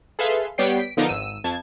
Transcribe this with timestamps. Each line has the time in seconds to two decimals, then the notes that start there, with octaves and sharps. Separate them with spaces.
0.19 G#4 A4 B4 E5 F5 C6
0.58 G3 B3 C#5 D5 G5 C7
0.79 B6 D7
0.97 D3 F3 B3 D#4 A#4 D6
1.09 G#1 E6 D#7
1.44 F2 A5 G#6